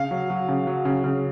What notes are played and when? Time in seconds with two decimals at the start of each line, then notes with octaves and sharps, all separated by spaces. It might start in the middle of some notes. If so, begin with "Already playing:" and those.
Already playing: C#3 F5
0.11 F#3
0.30 F#3
0.48 C#3
0.67 F#3
0.85 C#3
1.04 C#3